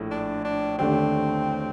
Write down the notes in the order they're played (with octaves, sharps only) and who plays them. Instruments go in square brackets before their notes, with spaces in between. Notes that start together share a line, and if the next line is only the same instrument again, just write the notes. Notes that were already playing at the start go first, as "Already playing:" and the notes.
Already playing: [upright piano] A#1 A2 A3
[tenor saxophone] D4
D4
[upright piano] D#2 D3 A3 D4 G4 [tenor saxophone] C4